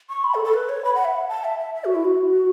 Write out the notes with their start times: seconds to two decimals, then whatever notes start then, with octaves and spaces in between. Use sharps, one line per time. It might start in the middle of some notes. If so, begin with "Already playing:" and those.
0.09 C#6
0.24 B5
0.34 A4
0.45 A4
0.54 B4
0.69 C#5
0.85 B5
0.95 F#5
1.05 E5
1.15 F#5
1.29 A5
1.44 E5
1.59 E5
1.75 E5
1.85 F#4
1.95 E4
2.05 F#4